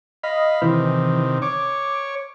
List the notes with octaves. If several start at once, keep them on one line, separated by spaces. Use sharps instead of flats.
D#5 F5 B5
C3 D#3 E3
C#5 D6